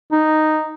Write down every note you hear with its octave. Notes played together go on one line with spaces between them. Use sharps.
D#4